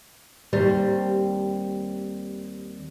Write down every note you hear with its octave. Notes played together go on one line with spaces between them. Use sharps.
D#2 G3 C4